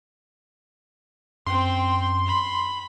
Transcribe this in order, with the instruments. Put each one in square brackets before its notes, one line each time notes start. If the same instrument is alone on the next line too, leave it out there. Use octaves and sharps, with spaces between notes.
[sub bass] F#2 [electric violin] C4 G5 [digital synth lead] C6
[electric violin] B5